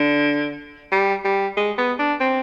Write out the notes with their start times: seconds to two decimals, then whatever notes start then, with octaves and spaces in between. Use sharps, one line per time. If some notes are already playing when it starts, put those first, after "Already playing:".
Already playing: D3
0.92 G3
1.25 G3
1.57 G#3
1.78 B3
1.99 D4
2.20 C4